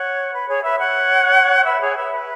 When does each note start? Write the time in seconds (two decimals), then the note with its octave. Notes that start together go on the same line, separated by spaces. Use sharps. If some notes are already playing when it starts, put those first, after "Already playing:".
Already playing: C#5 F#5
0.33 B4
0.49 G#4 C#5
0.63 B4 E5
0.78 C#5 F#5
1.66 B4 E5
1.81 G#4 C#5
1.96 B4 E5
2.11 B4